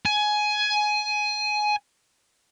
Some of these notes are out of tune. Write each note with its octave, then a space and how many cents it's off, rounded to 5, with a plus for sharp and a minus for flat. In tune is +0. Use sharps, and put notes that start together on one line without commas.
G#5 +15